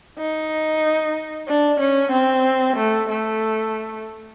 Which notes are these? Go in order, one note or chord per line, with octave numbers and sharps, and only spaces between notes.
D#4
D4
C#4
C4
A3
A3